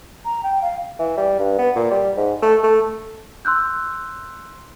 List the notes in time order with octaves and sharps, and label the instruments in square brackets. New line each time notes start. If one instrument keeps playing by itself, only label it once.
[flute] A#5
G5
F5
[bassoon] E3
G3
G2
B3
A#2
G3
G#2
A3
A3
[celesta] C6 E6 F#6 G6